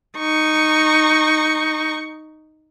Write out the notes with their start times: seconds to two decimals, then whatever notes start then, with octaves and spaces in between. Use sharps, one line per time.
0.19 D#4 C#6